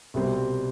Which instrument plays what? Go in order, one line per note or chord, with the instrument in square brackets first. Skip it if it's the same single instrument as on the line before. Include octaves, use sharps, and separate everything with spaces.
[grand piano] C2 B2 G3 C4